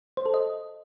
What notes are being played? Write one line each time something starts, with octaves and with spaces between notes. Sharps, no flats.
C5
A4
D#5